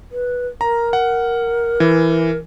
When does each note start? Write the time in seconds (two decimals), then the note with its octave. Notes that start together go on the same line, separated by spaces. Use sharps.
0.12 B4
0.61 A#4 A#5
0.93 F#5
1.80 E3